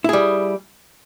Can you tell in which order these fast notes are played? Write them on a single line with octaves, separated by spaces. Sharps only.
E4 G#4 G3